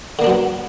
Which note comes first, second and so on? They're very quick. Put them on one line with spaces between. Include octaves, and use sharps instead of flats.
D3 A#3 D4 F#3 B3